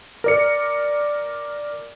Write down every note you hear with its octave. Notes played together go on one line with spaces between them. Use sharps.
A#4 D5 C#7